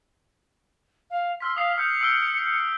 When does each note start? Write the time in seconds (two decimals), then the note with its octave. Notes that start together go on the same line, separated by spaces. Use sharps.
1.10 F5
1.40 C6 E6 F6 B6
1.57 F5 D#6 C7
1.78 F6 G6 C#7
2.01 E6 D7 G7